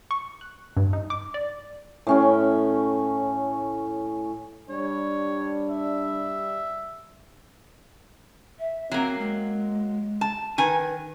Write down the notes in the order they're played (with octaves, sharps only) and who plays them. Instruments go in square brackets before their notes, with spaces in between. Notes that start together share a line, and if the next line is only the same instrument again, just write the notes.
[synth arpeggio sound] C#6
F#6
G2
D#4
D6
D5
[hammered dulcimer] A2 C#4 G5
[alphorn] G3 [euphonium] D4 [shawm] C#5
[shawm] E5
[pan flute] E5
[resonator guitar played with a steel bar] F#3 A#3 [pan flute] C4
[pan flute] G#3
[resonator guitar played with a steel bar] A5
[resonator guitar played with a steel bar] D#3 G#5 [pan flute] B4